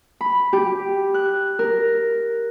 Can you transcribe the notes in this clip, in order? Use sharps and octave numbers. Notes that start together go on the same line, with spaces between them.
B5
G4
F#6
A#4